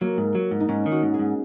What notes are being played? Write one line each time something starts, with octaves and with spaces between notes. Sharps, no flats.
F#3 A#3
G#2
F#3
G#2
D#4
G#2 C#4
D#3
F#4
G#2
G#4
G#2